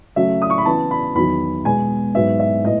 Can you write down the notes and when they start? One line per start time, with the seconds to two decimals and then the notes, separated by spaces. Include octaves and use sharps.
0.16 C#3 F#3 A3 E5
0.42 D#6
0.50 C#6
0.58 B5
0.65 C#3 E3 B3 A5
0.91 B5
1.15 E2 D#3 F#3 B5
1.65 B2 G#3 B3 G#5
2.14 G#2 F#3 B3 E5
2.40 E5
2.65 A2 B3 D#5